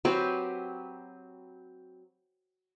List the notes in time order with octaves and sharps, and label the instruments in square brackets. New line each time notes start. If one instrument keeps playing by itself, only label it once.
[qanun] F#3 C4 G4 B4